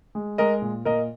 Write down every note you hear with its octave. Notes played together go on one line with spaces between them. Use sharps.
G#3
G#3 A#4 D#5
A#2
A#2 A#4 D#5